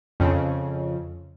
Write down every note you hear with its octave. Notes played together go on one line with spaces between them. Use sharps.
F2 C#3